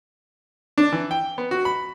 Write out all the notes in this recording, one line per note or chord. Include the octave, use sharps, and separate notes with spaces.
D4
E3
G5
B3
F#4
B5